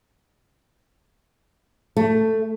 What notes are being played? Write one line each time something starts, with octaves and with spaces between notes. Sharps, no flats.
A3